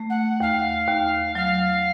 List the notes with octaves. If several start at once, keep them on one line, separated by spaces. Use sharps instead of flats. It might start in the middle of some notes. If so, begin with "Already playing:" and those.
Already playing: A3
F#5
D#2 F5
D#2
F#3 F5